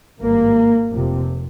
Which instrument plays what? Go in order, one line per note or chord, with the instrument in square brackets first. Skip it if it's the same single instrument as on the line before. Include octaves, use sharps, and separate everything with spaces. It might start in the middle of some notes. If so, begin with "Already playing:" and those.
[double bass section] G#1 G2 A#3
F1 F2 C3